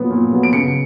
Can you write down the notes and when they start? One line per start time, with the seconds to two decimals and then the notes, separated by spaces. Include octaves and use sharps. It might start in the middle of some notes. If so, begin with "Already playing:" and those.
Already playing: A#2 F#3 B3
0.11 A#2
0.31 F#3 B3
0.43 D7
0.53 C#3 C#7